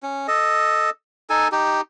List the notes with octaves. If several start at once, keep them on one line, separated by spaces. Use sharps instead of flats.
C#4
A4 D#5
D#4 A4 G#5
D#4 G4